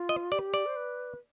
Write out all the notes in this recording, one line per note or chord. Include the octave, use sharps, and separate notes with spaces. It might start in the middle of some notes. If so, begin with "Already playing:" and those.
Already playing: F4
D#5
G4 D5
D5
C5
B4